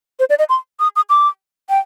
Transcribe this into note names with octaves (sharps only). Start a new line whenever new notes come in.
C5
D5
D#5
C6
D#6
D#6
D6
G5